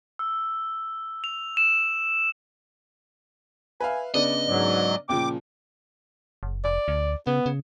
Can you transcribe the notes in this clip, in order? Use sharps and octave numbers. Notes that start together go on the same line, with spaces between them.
E6
F7
E7
B4 E5 F5 G#5
C#3 B3 D4 D5 D#5
G#2 F#3 D5
A#2 C#3 F3 G5 D6
F#1
F1 D5
D2
C#3 B3
C#3